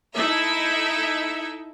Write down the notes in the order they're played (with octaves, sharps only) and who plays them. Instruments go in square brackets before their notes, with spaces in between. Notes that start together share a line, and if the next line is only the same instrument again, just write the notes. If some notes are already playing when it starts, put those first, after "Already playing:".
[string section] D#4 E4 A4 E5